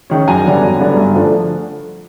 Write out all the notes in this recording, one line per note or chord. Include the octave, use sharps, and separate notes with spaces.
D#3 G#3 C#4
F#2 G#5 A#5
D3 G3 B3 D4
F#2
D3 G3 B3 D4
G2
D3 F3 A3 D4